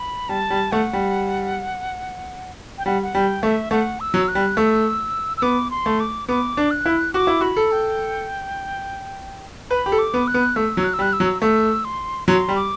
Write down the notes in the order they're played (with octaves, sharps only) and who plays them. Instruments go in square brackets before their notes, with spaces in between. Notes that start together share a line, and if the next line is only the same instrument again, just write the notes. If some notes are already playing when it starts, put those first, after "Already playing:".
Already playing: [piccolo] B5
[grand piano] G3 [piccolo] A5
[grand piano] G3
[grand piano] A3 [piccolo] F#5
[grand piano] G3
[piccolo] G5
[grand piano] G3 [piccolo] F#5
[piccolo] F#5
[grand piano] G3 [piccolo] G5
[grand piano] A3 [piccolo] E5
[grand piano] A3 [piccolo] F#5
[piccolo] E6
[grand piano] F#3
[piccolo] F#6
[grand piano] G3
[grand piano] A3 [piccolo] E6
[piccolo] E6
[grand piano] B3 [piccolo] D6
[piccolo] C6
[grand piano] A3
[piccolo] D6
[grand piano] B3 [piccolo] D6
[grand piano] D4
[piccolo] F#6
[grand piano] E4
[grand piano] F#4 [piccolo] D6
[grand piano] E4
[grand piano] F#4 [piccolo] B5
[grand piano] A4
[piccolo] G5
[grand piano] B4 [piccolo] B5
[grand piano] G4
A4
[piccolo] D6
[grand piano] B3
[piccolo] F#6
[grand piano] B3
[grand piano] A3 [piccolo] E6
[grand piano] F#3
[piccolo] F#6
E6
[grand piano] G3
[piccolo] F#6
E6
[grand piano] F#3
[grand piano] A3 [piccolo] E6
[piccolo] C6
[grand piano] F#3 [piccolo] C6
[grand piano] G3
[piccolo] D6